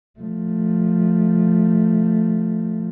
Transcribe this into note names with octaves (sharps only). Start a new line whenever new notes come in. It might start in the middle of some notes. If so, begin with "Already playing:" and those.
F3 A3